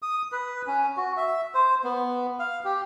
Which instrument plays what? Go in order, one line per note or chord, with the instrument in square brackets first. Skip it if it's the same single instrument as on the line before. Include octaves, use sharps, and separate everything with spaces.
[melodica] D#6
B4
C#4
F#4
E5
C5
B3
F5
G4